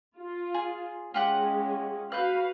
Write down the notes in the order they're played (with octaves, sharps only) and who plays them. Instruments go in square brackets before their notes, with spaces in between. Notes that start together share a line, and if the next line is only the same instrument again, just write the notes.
[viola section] F4
[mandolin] G#4
[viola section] G#3 C#4 [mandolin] F4 G4 F#5
[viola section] F#4 B4 F5 [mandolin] F#6 G6